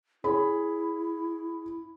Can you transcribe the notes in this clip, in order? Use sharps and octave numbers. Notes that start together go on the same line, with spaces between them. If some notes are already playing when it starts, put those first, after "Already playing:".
E4 G#4 C#5 B5